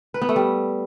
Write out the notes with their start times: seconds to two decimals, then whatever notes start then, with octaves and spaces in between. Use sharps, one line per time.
0.14 B4
0.22 B3
0.29 A3
0.36 G3